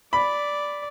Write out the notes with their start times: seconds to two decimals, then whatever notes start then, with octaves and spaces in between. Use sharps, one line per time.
0.13 D5 B5